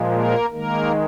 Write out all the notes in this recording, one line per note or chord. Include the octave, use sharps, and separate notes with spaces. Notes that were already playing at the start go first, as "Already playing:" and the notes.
Already playing: A#2 F3 G#3
A#3 A#4
D#3 G#3 A#3 A#4